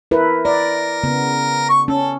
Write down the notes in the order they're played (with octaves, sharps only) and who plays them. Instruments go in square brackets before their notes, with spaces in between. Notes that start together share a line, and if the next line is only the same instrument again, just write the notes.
[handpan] E4 A#4 B4
[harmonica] A#4 [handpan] D5
[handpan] C#3 B3
[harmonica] C#6
[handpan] C#4 [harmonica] A4